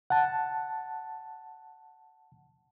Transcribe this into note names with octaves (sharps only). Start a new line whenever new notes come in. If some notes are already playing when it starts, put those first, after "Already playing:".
F#5 A5